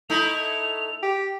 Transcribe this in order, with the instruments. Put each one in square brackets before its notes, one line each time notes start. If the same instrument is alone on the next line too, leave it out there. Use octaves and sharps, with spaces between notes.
[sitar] A3 D#4 E4 [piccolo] F7
[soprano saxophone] G4